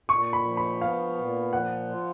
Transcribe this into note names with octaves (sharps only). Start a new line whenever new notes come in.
A#2 C#6
B5
F3
B5
B3 F5
A#2
F3 F#5
F4